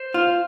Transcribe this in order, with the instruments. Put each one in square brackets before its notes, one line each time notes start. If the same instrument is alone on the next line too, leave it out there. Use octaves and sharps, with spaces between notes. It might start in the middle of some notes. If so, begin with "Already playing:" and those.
Already playing: [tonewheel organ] C5
[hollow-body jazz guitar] F4